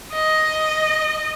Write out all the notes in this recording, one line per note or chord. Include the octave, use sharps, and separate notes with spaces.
D#5